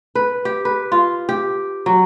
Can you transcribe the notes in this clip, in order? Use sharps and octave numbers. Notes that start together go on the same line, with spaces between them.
B4
G4
B4
F4
G4
F#3